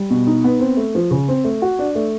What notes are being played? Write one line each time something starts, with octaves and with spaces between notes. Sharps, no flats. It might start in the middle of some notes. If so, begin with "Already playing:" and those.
Already playing: G3
B2
D#4
B3
C4
A3
F3
C#3
C4
A3
F#4
D4
A3